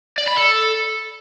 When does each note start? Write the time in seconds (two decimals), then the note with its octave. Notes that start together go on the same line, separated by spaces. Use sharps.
0.18 D5
0.28 B5
0.37 A4